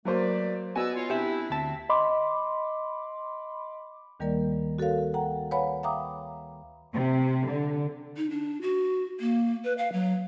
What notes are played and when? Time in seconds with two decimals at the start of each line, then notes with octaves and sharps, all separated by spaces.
0.05 F#3 A3 A#3 B4 C5 D5
0.75 B3 F#4 D5 D#5 G#5 E6
0.95 F4 C#5
1.10 C4 D4 E4 G4 E5
1.50 D2 C4 E5 A5
1.89 D#5 B5 C6 D6
4.20 D2 D#3 G3 A#3 A#4 D5
4.79 F#4 A4 A#4 C#5 F5
5.14 F#5 G5 A#5
5.51 B4 C#5 F5 F#5 G#5 B5
5.83 E5 F5 G5 A#5 D6 D#6
6.94 C3
7.49 D3
8.17 D#4
8.30 D4
8.62 F#4
9.20 A#3
9.64 B4
9.78 F5
9.93 F#3